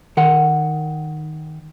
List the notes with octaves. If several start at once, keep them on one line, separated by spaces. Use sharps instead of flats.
D#3 A#4 F#5